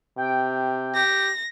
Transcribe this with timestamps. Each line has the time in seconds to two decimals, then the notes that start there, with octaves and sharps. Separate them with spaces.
0.18 C3 G5
0.95 G4 A#6